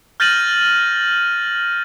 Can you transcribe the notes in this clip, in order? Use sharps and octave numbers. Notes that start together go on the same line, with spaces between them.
F6 G6 A6 A#6 D#7 F#7